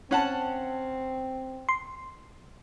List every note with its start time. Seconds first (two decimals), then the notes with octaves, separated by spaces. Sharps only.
0.11 C4 C#4 F#5 A5
1.69 C6